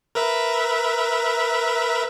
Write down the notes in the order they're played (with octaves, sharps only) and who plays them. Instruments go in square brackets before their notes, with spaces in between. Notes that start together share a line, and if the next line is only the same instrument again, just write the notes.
[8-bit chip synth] A#4 B4 E5